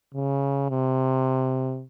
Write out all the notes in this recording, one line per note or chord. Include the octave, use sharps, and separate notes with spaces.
C#3
C3